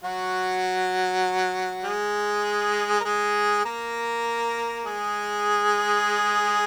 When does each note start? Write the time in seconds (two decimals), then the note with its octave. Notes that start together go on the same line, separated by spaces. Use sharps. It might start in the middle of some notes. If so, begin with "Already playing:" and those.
0.04 F#3 F#4
1.85 G#3 G#4
3.00 A#4
3.05 G#3 G#4
3.65 A#3 A#4
4.85 G#3 G#4